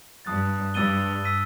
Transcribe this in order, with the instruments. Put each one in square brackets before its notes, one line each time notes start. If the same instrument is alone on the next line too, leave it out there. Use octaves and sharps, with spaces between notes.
[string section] G2 [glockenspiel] A5 D#6 F#6 A6
[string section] G2 [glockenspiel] E6 A6 D#7 G7
[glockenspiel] E6 B6 D#7